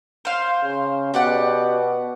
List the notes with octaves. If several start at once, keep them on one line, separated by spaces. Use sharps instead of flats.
C5 F5
C#3
B2 G4 D5 F#5